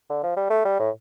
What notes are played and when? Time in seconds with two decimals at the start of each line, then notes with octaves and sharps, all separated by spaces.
0.10 D3
0.23 F3
0.37 G3
0.50 A3
0.65 G3
0.79 A2